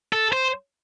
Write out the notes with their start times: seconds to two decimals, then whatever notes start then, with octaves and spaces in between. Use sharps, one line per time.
0.13 A4
0.33 C5